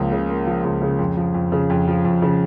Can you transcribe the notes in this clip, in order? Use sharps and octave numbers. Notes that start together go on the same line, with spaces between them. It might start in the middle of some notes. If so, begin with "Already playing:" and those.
Already playing: C#2 F3 A#3
C#3
A#3
F3
C#2
C#3
F2
F3
F2
C#3
F2
F3
F2
C#3